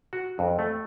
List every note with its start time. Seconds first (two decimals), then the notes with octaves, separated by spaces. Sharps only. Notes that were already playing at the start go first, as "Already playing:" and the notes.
0.13 F#4
0.39 F2
0.59 A3